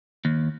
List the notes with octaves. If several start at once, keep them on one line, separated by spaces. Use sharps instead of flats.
D#2